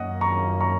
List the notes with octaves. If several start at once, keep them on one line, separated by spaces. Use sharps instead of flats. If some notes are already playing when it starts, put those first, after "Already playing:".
Already playing: F#2 D#3 A#3 C#4 D#5 F#5
A#5 C#6
A#5 C#6